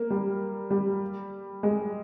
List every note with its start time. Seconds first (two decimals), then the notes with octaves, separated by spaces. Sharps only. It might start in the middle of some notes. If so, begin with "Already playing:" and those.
Already playing: A#3
0.10 G3
0.71 G3
1.63 G#3